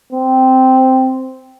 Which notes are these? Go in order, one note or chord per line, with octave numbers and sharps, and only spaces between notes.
C4